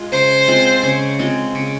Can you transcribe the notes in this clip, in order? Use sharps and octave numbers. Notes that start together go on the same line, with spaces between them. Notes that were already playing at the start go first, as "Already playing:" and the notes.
Already playing: G#3 F4
C#3 C5
G#3 C4 F4
C#3
G#3 C4 F4
C#3